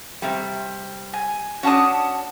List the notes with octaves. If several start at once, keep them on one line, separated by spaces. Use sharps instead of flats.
C3 G3
G#5
C#4 D4 F#4 A5 D#6